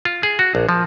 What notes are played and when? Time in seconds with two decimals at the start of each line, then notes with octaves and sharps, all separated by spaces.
0.05 F4
0.23 G#4
0.39 F#4
0.55 A#1
0.69 F3